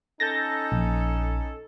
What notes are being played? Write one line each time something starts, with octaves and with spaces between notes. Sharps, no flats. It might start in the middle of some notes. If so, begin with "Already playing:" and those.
C#4 D#4 A4 G6 A6 A#6
A#1